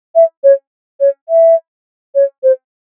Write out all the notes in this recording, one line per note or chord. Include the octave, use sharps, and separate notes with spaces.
E5
C#5
C#5
E5
C#5
C5